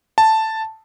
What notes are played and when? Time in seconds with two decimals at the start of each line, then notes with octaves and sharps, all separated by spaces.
0.18 A5